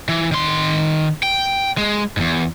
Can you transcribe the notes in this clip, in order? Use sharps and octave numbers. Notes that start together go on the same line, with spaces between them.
E3
D#3 C6
G5
G#3
E2 G#2